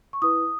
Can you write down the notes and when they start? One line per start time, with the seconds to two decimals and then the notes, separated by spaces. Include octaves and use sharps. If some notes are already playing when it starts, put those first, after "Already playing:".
0.13 C#6
0.22 E4 B4 D#6